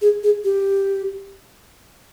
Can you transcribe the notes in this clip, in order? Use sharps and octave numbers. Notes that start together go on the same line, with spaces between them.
G#4
G#4
G4